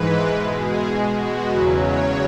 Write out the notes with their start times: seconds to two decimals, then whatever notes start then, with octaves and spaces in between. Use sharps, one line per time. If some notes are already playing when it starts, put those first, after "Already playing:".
Already playing: G#2 E3 G#3 B4
0.26 B2 G#3
0.56 G#4
0.87 B2 G#3 F#4
1.16 F#4
1.46 E2 C#3 F#3 B4
1.77 C#5